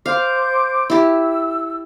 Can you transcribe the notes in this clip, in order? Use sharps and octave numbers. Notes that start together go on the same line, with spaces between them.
C5 F5 D6 G6
E4 G4 E6